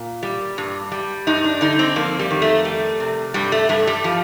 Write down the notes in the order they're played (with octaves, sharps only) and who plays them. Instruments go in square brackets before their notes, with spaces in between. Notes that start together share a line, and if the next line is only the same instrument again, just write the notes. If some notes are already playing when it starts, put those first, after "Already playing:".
Already playing: [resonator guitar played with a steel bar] A#2
G3
G2
G3
G2 D#4
D4
D3 D#4
C4
F2 A#3
G3
D#3
A3
G3
C3
G2 G3
A3
G2 A3
G3
F3